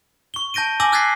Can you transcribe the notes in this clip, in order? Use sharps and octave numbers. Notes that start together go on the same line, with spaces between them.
C#6 G7
A5 G6 A#6 D7 D#7
G#5 D6 E6 A#6 F#7
E6 F#6 G#6 A6 B6 C7